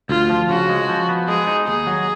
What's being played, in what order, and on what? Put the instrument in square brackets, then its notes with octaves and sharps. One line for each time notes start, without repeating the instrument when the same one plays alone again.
[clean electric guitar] D2 [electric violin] F4
[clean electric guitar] F3
[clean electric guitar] C#3 [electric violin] F#4
[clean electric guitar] G#3
F3
B3
[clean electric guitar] G#3 [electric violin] G#4
[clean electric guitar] D#4
[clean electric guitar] D#2 [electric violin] G#4
[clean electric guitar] F#3